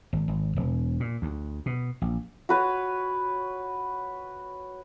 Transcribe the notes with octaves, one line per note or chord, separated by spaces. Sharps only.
G#1
G#1
E1
A#2
D2
B2
A#1
F#4 B4 C#5